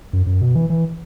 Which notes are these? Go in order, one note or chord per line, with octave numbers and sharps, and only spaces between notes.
F#2
F#2
B2
E3
E3